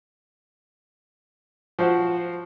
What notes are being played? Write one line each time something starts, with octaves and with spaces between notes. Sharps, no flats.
F3 F#4 C5 F#5